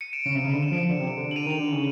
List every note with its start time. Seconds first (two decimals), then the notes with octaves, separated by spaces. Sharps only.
0.01 C#7 D#7
0.13 D7 E7
0.26 C#3
0.34 C3
0.44 C#3
0.53 D3
0.62 D7 E7
0.71 F3
0.89 D3
1.00 C3
1.17 D3
1.31 F#7
1.36 D#7 F7
1.46 D#3
1.59 D3
1.72 C#3